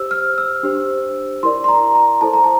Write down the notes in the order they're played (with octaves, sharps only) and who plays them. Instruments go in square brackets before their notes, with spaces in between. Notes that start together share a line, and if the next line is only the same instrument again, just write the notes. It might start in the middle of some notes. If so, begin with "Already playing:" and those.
Already playing: [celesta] G4 C5 E6
F6
E6
D4 G4 C5
E4 A#4 D5 C6
C6
A#5
A#5
E4 A4 C5 A5
A#5
A5